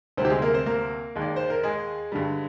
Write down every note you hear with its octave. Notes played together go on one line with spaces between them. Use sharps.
D2 C3 G3 C4 C5
G4
G#3 G#4
A#3 A#4
C4 C5
A#3 A#4
D#2 D#3 G#3
D5
C5
A#4
G#3 G#4
G2 D3 G3